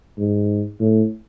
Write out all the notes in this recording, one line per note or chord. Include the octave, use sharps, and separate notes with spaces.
G#2
A2